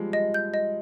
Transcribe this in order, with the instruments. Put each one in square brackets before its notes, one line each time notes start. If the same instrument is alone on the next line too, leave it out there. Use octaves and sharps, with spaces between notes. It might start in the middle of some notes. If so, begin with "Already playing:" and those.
Already playing: [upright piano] F3 G3 G#3
[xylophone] D#5
G6
D#5